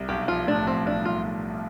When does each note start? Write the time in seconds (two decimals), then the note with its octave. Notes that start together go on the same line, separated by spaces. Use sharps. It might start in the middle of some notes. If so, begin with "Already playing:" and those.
Already playing: C2
0.09 B1 G4
0.28 F3 F4
0.47 A2 D4
0.67 F3 C4
0.86 B1 D4
1.05 B1 F4